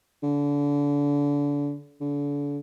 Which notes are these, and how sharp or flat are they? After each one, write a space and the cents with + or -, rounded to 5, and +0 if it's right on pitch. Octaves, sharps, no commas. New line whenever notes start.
D3 -30
D3 -35